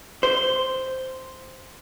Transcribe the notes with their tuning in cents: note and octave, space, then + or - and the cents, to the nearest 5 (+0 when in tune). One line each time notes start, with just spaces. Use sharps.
C5 -5